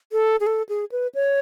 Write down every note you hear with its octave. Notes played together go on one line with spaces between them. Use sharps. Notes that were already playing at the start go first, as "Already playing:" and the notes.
A4
G#4
A4
G#4
B4
C#5